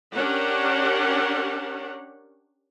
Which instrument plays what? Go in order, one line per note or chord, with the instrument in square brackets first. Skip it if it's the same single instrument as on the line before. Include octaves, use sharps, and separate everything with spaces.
[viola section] C#4 D4 G4 A#4 C#5 F#5